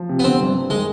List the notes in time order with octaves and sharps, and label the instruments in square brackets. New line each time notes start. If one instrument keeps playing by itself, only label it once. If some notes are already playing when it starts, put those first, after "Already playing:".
Already playing: [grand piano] F3
C3
[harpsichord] B3
[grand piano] D3 [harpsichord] C4
[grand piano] G2
G2
[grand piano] D#3 [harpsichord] G#3